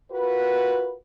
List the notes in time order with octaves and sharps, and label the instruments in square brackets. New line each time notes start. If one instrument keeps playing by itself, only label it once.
[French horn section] F4 F#4 A#4 B4